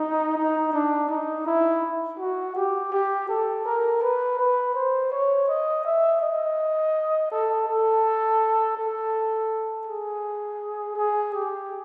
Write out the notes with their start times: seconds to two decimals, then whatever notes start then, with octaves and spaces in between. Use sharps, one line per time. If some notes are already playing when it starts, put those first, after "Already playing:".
Already playing: D#4
0.37 D#4
0.73 D4
1.09 D#4
1.46 E4
2.19 F#4
2.56 G4
2.92 G4
3.29 A4
3.66 A#4
4.02 B4
4.39 B4
4.75 C5
5.12 C#5
5.48 D#5
5.85 E5
6.21 D#5
7.32 A4
7.68 A4
8.77 A4
9.87 G#4
10.96 G#4
11.34 G4